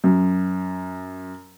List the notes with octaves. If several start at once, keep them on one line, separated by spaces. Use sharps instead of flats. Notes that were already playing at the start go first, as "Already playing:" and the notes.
F#2